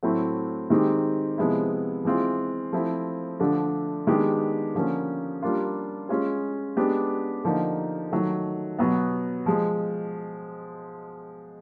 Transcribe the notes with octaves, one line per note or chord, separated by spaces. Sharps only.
A2 F#3 A3 C4 E4
D#3 G#3 C4 D#4 G4
C3 F3 G#3 B3 E4
E3 G#3 C4 F4
F3 A3 C4 E4
D3 F3 A3 D4
D#3 G#3 B3 D4 G4
D3 F3 A#3 C#4
G3 A#3 D4 F4
G#3 C#4 F4 G#4
G#3 B3 D4 G4
D3 F3 A#3 D#4
D#3 F#3 A3
B2 F#3 B3
F3 G#3